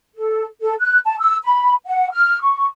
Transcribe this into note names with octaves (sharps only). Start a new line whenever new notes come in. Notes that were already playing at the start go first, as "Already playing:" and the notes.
A4
A4
F#6
A5
E6
B5
F#5
F6
C#6